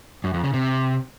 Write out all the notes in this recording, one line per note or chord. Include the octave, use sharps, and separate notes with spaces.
F#2
F2
C#3
C3